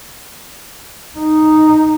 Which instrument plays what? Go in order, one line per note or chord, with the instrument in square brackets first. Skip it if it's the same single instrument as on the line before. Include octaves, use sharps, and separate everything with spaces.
[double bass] D#4